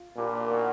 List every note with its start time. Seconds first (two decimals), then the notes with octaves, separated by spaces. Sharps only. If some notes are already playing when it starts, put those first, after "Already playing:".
Already playing: F4
0.17 A#2 A#3 D4 G4 B4
0.50 B3 D#4 F#4 A#4